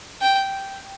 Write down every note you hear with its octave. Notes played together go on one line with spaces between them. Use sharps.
G5